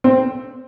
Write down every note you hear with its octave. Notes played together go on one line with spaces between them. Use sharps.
C4